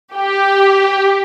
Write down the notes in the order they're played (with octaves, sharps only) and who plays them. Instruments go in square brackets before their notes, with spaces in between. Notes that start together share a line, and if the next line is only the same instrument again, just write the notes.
[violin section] G4